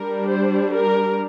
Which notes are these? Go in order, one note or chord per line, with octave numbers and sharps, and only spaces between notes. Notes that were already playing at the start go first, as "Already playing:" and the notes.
Already playing: G3 D4 A#4
C5
A#4